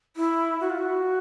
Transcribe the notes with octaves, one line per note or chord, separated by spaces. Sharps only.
E4
F#4
F4
F#4